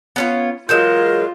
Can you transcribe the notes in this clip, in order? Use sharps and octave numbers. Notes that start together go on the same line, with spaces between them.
B3 C#4 F4
E3 F#3 G#3 F4 A#4 G6 E7